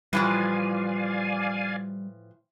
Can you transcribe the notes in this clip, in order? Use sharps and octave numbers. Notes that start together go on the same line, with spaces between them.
A2 E3 F3 G3 D5 F5 G#5